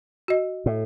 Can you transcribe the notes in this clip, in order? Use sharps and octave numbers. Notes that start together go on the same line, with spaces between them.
F#4 D#5
A2